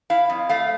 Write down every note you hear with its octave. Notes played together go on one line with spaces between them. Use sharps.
E4 F5
F2
A3 F5